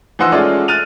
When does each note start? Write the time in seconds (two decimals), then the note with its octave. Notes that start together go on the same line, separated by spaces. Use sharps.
0.19 E3 F3 D#4 F#5 C6 E6
0.32 G#3 A3 C#4 F4 D5
0.68 F6 F#6 A6 D#7 F7